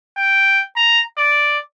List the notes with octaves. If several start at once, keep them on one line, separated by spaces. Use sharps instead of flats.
G5
A#5
D5